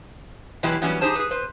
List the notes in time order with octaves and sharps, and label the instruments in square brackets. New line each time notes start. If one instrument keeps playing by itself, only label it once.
[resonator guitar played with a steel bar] B2 E3 F#3 G#3 E4 G4
E3 F#3 G3 B3 C#4
D#4 G4 G#4 C5 A5
G#4 B4
B4 C5